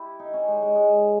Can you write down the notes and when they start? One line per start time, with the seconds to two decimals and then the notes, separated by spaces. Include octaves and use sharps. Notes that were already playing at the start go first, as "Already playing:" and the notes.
Already playing: E4 G4
0.19 D#4
0.34 C#4
0.48 G#3
0.62 G#3
0.75 G#3